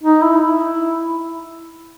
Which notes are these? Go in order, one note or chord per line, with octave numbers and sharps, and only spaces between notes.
D#4
E4
E4